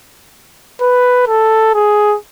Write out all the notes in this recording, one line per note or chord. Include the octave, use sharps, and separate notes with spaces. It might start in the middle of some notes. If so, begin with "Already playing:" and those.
B4
A4
G#4